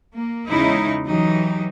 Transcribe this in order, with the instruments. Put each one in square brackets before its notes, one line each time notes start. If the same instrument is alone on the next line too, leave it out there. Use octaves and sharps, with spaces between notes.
[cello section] A#3
E2 C#3 G#3 C#4 D#4 E4
E3 F#3 D#4 G4